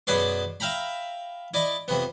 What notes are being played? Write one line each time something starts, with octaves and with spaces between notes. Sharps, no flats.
F#2 B2 G#4 B4 D5 C6
E5 F5 G5 A#5 B5
E4 D5 D#5
F2 C3 B3